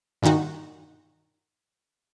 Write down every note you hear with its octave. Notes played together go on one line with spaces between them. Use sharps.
G2 A#2 D#3 D#4 F#4